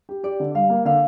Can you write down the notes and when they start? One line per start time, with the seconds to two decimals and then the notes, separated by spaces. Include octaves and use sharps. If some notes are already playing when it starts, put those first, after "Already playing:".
0.09 G4
0.23 G4 D5
0.40 D3
0.54 G3 F5
0.70 A#3
0.85 D3 F5